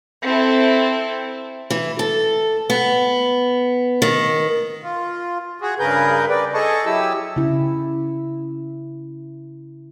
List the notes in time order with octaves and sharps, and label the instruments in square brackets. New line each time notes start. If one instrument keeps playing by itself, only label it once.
[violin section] C4 E4 A4
[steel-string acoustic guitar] E3
A4
B3
D#3
[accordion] F4
F#4 G#4
G2 C#3 G#4 A#4 B4 G6
B4 D5 G5
G#4 A4 D#5 A5 C#6
F#3 E4 G4 E6
[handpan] C#3 E4